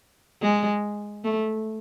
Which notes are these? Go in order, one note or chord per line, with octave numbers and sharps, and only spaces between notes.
G#3
A3